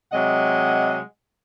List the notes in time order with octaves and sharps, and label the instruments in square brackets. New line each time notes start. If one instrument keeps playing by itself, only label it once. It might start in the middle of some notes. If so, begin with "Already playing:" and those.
[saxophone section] C3 F#3 G#3 D#5 F#5